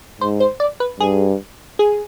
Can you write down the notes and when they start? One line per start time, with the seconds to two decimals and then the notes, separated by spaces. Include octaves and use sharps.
0.21 G#2 C5
0.40 C5
0.60 D5
0.80 B4
1.00 G2 G#4
1.79 G#4